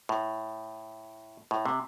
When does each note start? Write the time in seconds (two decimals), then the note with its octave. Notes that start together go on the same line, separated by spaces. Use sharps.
0.09 A2
1.51 A2
1.66 C3